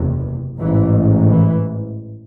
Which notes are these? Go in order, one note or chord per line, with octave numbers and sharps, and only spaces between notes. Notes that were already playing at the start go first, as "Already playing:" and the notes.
Already playing: F#1 E2 C3
A1 G#2 E3
E3